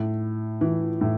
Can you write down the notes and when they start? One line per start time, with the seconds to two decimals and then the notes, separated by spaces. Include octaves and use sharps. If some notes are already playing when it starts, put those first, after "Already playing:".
Already playing: A2
0.61 E3
1.01 A2